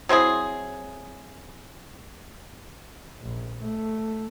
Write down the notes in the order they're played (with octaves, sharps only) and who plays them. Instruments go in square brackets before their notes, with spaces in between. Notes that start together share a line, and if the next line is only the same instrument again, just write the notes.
[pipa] F#3 C4 E4 G#4
[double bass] A#1
A3